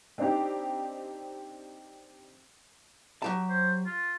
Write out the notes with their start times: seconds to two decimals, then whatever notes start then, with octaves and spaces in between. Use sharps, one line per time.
0.18 C4 D4 D#4 G4
3.22 F#3 G4 A5
3.49 C5
3.86 F4